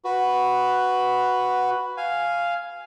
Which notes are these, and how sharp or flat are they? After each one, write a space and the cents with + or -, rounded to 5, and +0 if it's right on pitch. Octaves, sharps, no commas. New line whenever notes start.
F#4 +0 B4 +0
F5 -5 G#5 +0